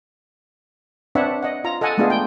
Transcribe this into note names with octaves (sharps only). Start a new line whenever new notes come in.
C4 D4 B4 C#5 E5 F#5
D#5 F#5
F4 A#5
A4 D#5 F#5 G#5 A5
G#3 A3 B3 D4 F4 G#4
G5